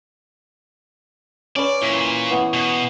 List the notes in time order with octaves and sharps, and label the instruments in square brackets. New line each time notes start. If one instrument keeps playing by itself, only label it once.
[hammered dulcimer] C#4 B4 [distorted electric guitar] D5
[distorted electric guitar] A#2 [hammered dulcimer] E3
[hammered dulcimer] E3 B3
[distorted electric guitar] B2